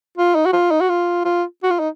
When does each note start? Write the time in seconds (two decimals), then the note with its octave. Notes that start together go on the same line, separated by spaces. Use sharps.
0.18 F4
0.35 D#4
0.46 F#4
0.53 F4
0.71 D#4
0.81 F#4
0.89 F4
1.25 F4
1.63 F#4
1.70 F4
1.79 D#4